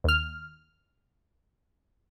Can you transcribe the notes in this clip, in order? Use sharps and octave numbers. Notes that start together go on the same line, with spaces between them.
D#2 F6